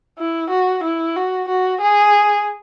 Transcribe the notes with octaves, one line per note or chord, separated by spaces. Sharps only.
E4
F#4
E4
F#4
F#4
G#4